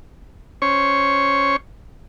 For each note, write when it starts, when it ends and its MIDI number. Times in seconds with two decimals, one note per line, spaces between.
0.62 1.56 61
0.62 1.56 72
0.62 1.56 73
0.62 1.56 85